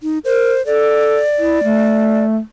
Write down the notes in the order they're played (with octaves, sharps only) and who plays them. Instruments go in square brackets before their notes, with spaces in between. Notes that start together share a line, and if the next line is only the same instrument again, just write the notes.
[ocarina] D#4
[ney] A#4 [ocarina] C5
[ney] A4 [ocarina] D5
[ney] E4
A3